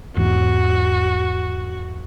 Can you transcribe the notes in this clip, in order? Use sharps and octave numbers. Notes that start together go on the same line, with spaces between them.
E2 G#2 E3 F#4